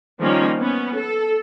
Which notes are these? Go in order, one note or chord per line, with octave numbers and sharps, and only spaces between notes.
D#3 F3 G3 A#3 C#4
B3 C#4
A4